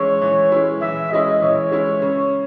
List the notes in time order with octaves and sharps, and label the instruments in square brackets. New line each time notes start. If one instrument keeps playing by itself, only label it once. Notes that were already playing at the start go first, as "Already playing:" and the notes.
Already playing: [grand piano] E3 G#3 C#4 E4 [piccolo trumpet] C#5
[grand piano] E3
G#3 C#4 E4
[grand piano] E3 [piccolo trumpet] E5
[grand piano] G#3 C#4 E4 [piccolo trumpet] D#5
[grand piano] E3 [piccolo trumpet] C#5
[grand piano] G#3 C#4 E4
C#3